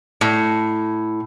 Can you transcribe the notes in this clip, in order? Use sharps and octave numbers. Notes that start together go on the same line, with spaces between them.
A2